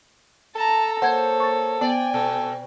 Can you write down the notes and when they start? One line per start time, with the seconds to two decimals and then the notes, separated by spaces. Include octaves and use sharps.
0.55 A4 A5 A#5
1.02 A#3 C5 C#5 F#5 G#6
1.40 C#6 A6
1.81 B3 D5 G5 G#5
2.14 B2 A4